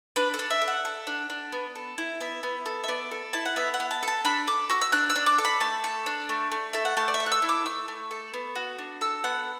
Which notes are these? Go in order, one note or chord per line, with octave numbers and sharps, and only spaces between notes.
D4 B4
A4
D4
E5
A4
F#5
A4
D4
D4
B3
A4
E4
B3 E5
B3
A4
E5
B3 D5
A4
E4 A5
F#5
B3 E5
F#5
B3
A5
A4
A5
D4 B5
A4 D6
F#4 E6
E6
D4 F#6
E6
D4
D6
A4
B5
A3 A5
A4
D4
A3
A3
A4 E5
F#5
A3 A5
D5
E5
A4
F#6
E6
E4
D6
A3 E6
A3
A4
B3
F#4
D4
A4 E6
B3 F#5